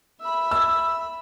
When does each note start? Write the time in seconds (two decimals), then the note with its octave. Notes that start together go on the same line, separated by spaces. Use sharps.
0.20 E5 B5
0.51 E6